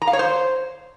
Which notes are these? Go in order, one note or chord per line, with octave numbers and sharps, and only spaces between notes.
A#5
F5
C#5
C5